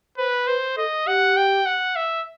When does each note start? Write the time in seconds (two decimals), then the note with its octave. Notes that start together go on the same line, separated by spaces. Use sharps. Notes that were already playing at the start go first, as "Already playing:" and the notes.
0.17 B4 C5
0.47 B4 C5
0.76 A4 D#5
1.07 G4 F#5
1.37 G5
1.66 F#5
1.96 E5